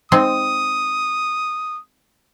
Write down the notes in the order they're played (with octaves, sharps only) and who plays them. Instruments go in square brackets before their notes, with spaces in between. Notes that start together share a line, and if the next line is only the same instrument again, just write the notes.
[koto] G#3 C4 D#4 [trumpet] D#6